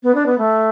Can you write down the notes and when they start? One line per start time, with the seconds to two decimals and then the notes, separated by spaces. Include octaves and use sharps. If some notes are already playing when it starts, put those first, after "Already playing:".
0.03 B3
0.15 D4
0.26 B3
0.38 A3